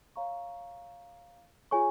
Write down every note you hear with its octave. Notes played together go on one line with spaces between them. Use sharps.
C#5 F5 A#5 C#6
F4 G#4 C#5 G#5 C#6